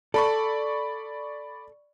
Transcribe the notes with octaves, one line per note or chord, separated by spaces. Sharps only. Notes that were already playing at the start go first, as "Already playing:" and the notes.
A4 D5 B5 C#6